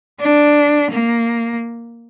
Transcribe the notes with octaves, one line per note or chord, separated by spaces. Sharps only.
D4
A#3